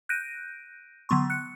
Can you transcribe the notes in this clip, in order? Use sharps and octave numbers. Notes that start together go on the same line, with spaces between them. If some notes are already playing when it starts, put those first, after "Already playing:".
F#6 G6 A#6 D7 D#7
D3 F#3 B3 C6 C#6
F#6 C#7